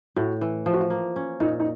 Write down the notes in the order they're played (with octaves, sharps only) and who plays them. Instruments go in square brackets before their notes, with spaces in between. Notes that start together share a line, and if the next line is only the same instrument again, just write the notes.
[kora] A2 [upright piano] F#4
[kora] E3
[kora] F3 [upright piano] F4
[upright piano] F#4
F4
[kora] A#3
C#4
[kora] A#2 [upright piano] D#4
[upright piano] D#4